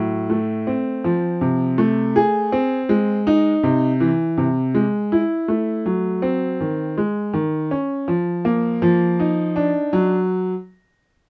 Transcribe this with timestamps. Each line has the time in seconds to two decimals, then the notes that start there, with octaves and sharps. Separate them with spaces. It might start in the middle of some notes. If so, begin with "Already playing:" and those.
Already playing: A2 F#3
0.30 A3
0.67 C4
1.04 F3
1.41 C3
1.78 A3
2.16 G#4
2.52 C4
2.89 G#3
3.27 D#4
3.63 C3
4.00 E3
4.37 C3
4.75 G#3
5.12 E4
5.48 A3
5.86 F#3
6.22 C4
6.60 D#3
6.98 G#3
7.33 D#3
7.71 C#4
8.08 F3
8.45 A#3
8.82 F3
9.20 D#4
9.56 D4
9.93 F#3